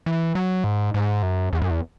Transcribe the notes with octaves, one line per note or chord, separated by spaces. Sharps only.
E3
F#3
G#2
G#2
F#2
E2
F#2
E2